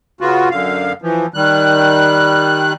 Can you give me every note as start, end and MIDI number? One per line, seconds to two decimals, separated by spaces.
0.21 0.49 49
0.21 0.49 59
0.21 0.49 65
0.21 0.49 66
0.51 0.93 42
0.51 0.93 50
0.51 0.93 77
1.02 1.26 52
1.02 1.26 53
1.34 2.73 51
1.34 2.73 55
1.34 2.73 90